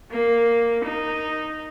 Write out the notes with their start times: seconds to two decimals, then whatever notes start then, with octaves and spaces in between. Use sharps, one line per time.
0.11 A#3
0.85 D#4